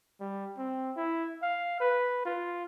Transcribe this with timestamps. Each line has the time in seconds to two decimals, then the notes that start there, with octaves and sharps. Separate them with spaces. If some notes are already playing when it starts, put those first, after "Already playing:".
0.20 G3
0.58 C4
0.96 E4
1.42 F5
1.80 B4
2.25 F4